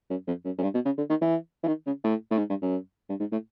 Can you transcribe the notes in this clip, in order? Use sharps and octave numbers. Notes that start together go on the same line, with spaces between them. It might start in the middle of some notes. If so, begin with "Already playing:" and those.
F#2
F2
F#2
F#2
G2
B2
C#3
D3
D#3
E3
E3
D#3
C#3
A2
A2
G#2
G2
F#2
G2
G#2
A2